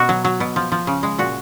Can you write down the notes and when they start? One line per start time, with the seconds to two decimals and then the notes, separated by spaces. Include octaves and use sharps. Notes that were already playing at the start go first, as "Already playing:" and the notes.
Already playing: B2 F#4
0.09 F#3
0.25 F#3
0.40 B2
0.56 F3
0.72 F3
0.87 C#3
1.03 G#3
1.19 A#2 F#4